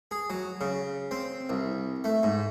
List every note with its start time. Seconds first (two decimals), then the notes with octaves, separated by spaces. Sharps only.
0.11 G#4
0.30 F#3
0.61 C#3
1.11 C4
1.49 C2
2.04 A3
2.23 G#2